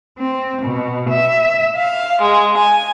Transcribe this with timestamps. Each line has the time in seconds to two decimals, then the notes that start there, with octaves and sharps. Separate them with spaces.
0.18 C4
0.62 B2
1.10 E5
1.76 F5
2.21 G#3
2.57 G#5